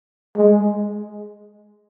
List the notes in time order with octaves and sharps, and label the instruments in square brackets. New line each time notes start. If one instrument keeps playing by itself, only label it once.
[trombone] G#3